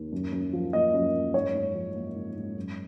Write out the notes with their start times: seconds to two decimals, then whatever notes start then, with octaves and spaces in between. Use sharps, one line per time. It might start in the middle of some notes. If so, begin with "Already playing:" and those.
Already playing: D#2
0.12 F#2
0.32 F#2
0.53 F3
0.73 A#3 D#5
0.94 F#2
1.14 F#2
1.34 G#2 C#5
1.55 G#2
1.75 F3
1.95 A#3
2.15 G#2
2.36 G#2
2.56 F#2